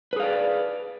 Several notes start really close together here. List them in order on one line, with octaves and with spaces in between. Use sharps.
B4 G#4 F5 D5